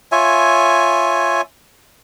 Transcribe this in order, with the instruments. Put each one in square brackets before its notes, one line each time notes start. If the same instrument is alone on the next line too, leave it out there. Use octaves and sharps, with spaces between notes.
[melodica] F4 C#5 E5 G#5